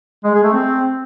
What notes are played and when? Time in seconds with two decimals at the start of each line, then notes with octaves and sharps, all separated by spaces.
0.24 G#3
0.34 G#4
0.44 A3
0.53 C4